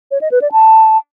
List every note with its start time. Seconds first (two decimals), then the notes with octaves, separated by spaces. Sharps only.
0.11 C#5
0.21 D#5
0.31 B4
0.42 D5
0.52 A5